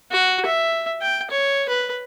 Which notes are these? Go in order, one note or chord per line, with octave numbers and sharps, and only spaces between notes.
F#4
E5
G5
C#5
B4